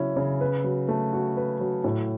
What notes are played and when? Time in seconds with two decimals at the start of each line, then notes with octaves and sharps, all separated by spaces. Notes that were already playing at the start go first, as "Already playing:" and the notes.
Already playing: C#3 F#3 C#4 E4
0.16 C#3
0.41 B4
0.64 F#3
0.89 A3
1.13 F#4
1.37 B4
1.61 F#3
1.84 A2